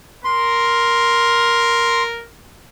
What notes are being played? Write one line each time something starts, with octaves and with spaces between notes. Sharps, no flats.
A#4 C6